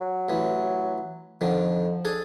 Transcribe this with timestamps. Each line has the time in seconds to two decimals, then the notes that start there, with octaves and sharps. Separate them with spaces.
0.01 F#3
0.29 A1 E3
1.41 F2 D3 D#3 F3
2.05 D4 G#4 A4